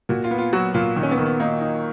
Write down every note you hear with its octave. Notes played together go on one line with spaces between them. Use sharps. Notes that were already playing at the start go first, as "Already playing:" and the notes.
A#2 F#4
F4
B3
F4
F#3 F#4
A#2 F4
D#3
C#4
B3
D#3
B3
A#3 D#4
D#4